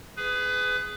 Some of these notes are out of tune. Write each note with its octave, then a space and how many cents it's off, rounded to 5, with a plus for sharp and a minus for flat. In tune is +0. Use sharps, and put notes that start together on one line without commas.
G#4 +0 B4 +25